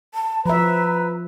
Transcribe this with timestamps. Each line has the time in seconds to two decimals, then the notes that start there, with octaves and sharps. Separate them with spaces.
0.14 A5
0.46 F3 B4 E5 A#5